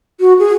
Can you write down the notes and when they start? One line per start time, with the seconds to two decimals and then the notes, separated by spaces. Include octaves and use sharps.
0.20 F#4
0.39 G#4